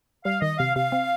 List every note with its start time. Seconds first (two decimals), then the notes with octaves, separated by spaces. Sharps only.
0.25 G3 F5
0.42 D#3 D#5
0.59 C3 F5
0.76 C3 F5
0.92 C4